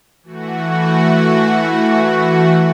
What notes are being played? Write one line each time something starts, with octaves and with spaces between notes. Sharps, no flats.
E3 A3 F#4